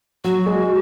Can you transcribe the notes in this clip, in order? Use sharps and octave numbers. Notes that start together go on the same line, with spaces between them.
F#3 F#4
G#3